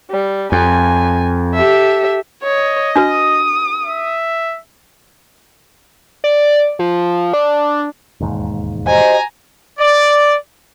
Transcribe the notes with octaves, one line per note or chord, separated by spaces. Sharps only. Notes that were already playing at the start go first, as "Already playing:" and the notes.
G3
F2 G#5
G4 A4 E5
C#5 D#5
D4 F#4 B4 D#6
E5
D5
F3
D4
E1 D#2 G#2
F#4 G4 C5 D#5 G#5 A#5
D5